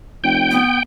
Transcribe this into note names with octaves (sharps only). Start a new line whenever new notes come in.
F1 G5
B3